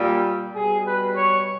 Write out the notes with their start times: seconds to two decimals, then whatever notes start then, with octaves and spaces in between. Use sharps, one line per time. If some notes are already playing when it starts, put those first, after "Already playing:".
Already playing: A#2 G3
0.53 B2 G3 G#4
0.85 B4
1.15 C#5